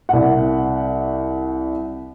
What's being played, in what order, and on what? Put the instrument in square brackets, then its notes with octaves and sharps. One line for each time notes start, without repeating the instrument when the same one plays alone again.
[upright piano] C2 F#5